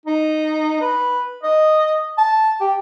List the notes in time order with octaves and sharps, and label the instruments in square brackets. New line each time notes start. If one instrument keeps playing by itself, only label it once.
[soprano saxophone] D#4
B4
D#5
A5
G4